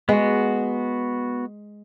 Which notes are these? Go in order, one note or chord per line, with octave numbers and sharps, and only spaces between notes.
G#3 B3 F#4